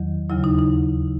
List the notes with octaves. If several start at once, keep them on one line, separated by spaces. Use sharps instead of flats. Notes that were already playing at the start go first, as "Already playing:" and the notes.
Already playing: E2 D#3 F#3
D#2 C#3 F#3 E4
D#4
D#4